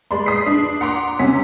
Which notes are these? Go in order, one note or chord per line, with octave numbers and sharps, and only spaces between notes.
G#3 D5 B5 C6
D#6 B6 C7
D4
F#5 A#5 C6 D6
C3 C#4 B6